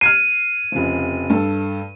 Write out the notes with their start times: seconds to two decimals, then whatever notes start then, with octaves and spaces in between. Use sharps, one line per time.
0.01 F6 G#6 C7 D#7
0.72 F1 C#3 F3
1.30 G2 A4